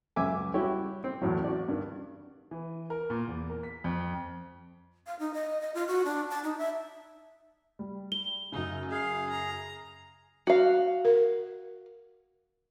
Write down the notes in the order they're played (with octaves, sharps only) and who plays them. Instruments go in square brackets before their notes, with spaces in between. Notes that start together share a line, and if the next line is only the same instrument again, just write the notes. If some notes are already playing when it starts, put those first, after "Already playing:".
[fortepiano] C#2 F#2 E5 G#5 D6
G3 E4 F#4 G4 C#5
C4
E2 A2 F#3
F#4 D5
G2 D#3
[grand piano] E3
A#4
A#2
E2
A#4
B6
F2
[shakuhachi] F5
D#4
D#5
D#5
F4
F#4
D4
A5
D#4
E5
[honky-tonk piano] G3
[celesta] G7
[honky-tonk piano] F#2 C#3 [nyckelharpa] D#4
[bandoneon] G#4 [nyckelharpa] F5
[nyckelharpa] A#5
[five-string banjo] F#4 F5
[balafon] A#4